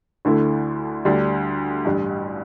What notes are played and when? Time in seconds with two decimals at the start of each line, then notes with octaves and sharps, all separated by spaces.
0.25 D2 D3 A3 E4
1.05 D2 D3 G3 D4
1.85 A1 G2 G3